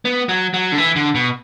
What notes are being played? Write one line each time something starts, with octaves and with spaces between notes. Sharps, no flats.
B3
F#3
F#3
D3
E3
D3
B2